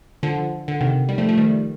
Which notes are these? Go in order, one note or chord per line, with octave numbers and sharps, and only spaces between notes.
D3 F3
D3
C3 D#3
D#3 G3
F3 A3
F3 A3
D#3 G3